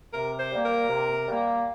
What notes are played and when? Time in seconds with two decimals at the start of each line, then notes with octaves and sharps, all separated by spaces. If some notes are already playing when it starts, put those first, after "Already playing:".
0.13 C3 A#4
0.39 C5
0.52 G3 A#3
0.65 A#4
0.89 C3
1.27 G3 A#3